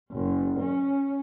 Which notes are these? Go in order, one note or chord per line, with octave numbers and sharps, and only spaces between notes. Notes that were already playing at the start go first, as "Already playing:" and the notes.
F#1
C#4